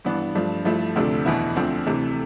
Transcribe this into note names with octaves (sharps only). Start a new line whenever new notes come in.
G2 E3 B3 D4
G2 F3 A3 D4
G2 F3 A3 E4
D2 C3 F3 A3 D4
E2 B2 B3 E4
D2 D3 F3 C4
C3 E3 A3